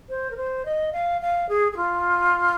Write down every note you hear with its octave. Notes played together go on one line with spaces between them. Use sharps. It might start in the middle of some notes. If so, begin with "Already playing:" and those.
C5
A#4
C5
D#5
F5
F5
G#4
G#4
F4